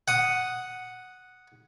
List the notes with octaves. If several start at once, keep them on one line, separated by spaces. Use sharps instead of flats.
F#5 D#6